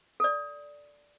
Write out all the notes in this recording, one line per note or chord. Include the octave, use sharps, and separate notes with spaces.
A4 D5